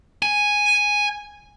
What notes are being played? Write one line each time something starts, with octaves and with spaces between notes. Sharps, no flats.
G#5